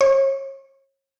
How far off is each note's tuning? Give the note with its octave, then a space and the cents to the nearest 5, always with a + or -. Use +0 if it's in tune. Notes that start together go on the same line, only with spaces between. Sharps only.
C#5 -35